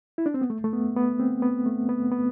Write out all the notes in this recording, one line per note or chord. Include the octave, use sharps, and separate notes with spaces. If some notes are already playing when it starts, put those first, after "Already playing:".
E4
D4
C4
B3
A3
A3
B3
B3
C4
B3
A3
B3
B3